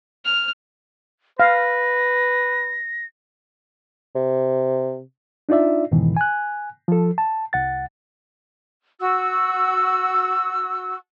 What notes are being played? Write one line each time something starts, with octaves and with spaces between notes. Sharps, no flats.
F6
B4 F5 A#6
C3
D4 D#4 F4 D5 E5
E2 G#2 B2 D#3 E3
G#5 F#6
F3 A4
A5
C2 F#5 A6
F#4 E6